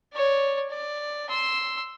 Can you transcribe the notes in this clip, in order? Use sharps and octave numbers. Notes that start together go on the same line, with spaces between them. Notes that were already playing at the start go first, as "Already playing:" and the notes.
C#5 D5
D5
C6 E6